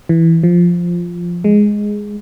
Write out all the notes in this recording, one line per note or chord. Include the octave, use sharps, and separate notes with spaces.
E3
F3
G#3